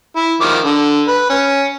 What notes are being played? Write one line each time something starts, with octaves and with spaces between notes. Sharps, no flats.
E4
D#3 F3 D6
D3
B4
C#4